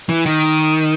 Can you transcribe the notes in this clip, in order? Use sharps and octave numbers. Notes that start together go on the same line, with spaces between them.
E3
D#3